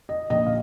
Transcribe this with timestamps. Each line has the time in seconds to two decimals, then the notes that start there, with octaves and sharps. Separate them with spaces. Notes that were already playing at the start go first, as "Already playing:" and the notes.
0.09 D#5
0.30 A#1 A#2 D#5
0.46 F5